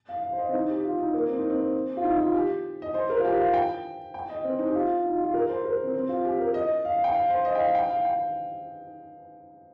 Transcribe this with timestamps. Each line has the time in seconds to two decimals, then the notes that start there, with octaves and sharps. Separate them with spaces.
0.09 F5
0.23 F5
0.33 C5
0.38 D#5
0.49 C4
0.53 D#4
0.69 G4
0.84 F4
0.99 D#4
1.14 A#3
1.28 C4
1.39 D#4
1.50 C4
1.97 F4
2.04 D#4
2.19 F4
2.34 G4
2.82 D#5
2.94 C5
3.10 A#4
3.19 F4
3.25 G4
3.40 F5
3.53 G5
4.14 G5
4.29 D#5
4.44 C4
4.59 D#4
4.69 G4
4.75 F4
5.04 D#4
5.14 F4
5.24 F4
5.34 A#4
5.49 C5
5.65 A#4
5.84 C4
5.94 C4
6.09 F4
6.25 G4
6.40 A#4
6.54 D#5
6.85 F5
7.04 G5
7.14 F5
7.30 C5
7.45 D#5
7.55 G5
7.59 F5
7.75 G5
7.89 F5
8.05 G5